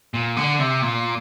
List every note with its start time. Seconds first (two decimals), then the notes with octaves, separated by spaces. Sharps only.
0.14 A#2
0.37 D3
0.59 C3
0.82 A#2